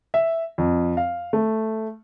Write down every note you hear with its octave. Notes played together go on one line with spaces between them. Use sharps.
E5
F2
F5
A3